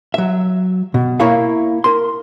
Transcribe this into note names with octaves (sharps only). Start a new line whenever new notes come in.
F#3 E5
B2
A#3 E4 A#4 C#5 E5 F5
A#4 C6